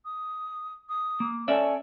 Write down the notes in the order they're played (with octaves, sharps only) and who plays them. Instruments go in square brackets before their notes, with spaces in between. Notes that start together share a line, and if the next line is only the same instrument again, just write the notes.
[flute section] D#6
D#6
[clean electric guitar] A#3
[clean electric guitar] C#4 D5 E5 [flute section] A4 C#5 G#5